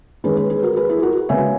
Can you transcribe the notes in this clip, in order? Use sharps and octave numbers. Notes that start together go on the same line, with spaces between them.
D#3 G#3 C#4 G#4 B4
G#4 B4
G#4 B4
F#4 A#4
G#4 B4
E4 G#4
F#4 A#4
C#3 G#3 B3 E5 G#5